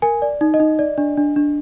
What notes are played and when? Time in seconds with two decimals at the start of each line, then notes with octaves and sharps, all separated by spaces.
0.02 A#4 G#5
0.22 D5
0.41 D#4
0.54 D#5
0.60 D#4
0.79 D5
0.98 D4
1.17 D4
1.36 D4